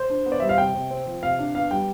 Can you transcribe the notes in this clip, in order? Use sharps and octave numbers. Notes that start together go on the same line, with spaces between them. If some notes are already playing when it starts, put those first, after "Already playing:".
Already playing: C5
D4
B3
D5
G3 E5
F5
C3 G5
C3
C4
F3
C3 F5
D4
B3 F5
G3 G5